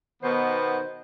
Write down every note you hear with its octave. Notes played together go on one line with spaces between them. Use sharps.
B2 D#3 B3 C5